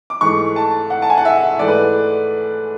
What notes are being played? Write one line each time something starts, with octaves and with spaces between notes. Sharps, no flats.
D6
G#2 E3 A3 C#6
A5
F#5
A5
G#5
F#5
E5
G#2 E3 A3 D5
B4